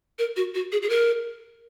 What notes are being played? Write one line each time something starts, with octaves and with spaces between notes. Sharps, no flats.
A#4
F#4
F#4
G#4
G#4
A#4